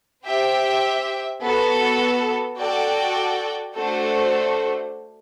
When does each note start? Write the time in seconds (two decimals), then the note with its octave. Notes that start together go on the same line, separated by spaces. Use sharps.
0.25 G4 C5 E5 G5
1.41 B3 F#4 A4
2.59 F#4 A4 D5 G5
3.75 A3 D4 F#4 A4 C5